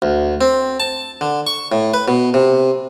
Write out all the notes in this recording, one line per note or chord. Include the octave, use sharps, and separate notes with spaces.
D2
C4
A5
D3
C#6
A2
B4
B2
C3